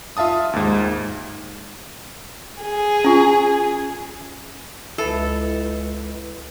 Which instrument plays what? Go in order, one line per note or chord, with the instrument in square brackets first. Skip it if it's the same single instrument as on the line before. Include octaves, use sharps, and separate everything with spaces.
[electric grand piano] F4 E5 F5 A5 D#6
D#2 G#2
[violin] G#4
[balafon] C#4 F4
[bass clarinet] C#2 [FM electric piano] E4 B4 [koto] A4